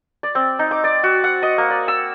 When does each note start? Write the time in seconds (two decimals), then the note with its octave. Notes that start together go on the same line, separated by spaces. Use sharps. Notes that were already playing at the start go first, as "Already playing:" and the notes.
0.23 D5
0.35 C4
0.59 D#4
0.71 D6
0.84 D5
1.04 F#4
1.24 F#5
1.43 D#5
1.58 A#3
1.70 D5
1.88 E6